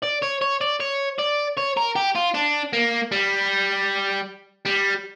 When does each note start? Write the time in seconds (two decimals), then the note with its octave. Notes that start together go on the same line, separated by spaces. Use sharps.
0.03 D5
0.22 C#5
0.41 C#5
0.61 D5
0.80 C#5
1.18 D5
1.57 C#5
1.77 A#4
1.96 G4
2.16 F4
2.35 D4
2.73 A#3
3.12 G3
4.66 G3